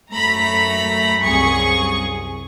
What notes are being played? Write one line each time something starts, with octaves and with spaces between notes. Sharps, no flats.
F#2 A3 A#5 B5
C2 F#2 G#4 C#6